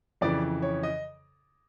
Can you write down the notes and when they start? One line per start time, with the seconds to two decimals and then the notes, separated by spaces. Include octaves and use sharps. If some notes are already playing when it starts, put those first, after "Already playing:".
0.21 F2 C#3 E3 D5
0.62 C#5
0.83 D#5